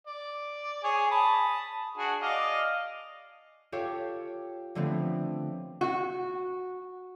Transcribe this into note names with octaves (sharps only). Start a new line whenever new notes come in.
D5
G#4 C#5 G#5
A5 B5 D#6
D4 F#4 G#4
D5 D#5 F5
F4 G4 A4 C#5 F5
D3 F3 A3 B3 C4
F#4